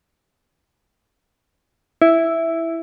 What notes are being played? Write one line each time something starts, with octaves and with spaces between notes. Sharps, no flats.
E4